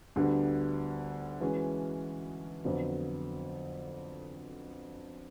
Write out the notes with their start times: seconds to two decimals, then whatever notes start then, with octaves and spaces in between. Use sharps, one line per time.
0.16 D2 D3 G3 B3
1.41 E3 G#3 C#4 F#4 B4
2.65 F2 D3 F#3 B3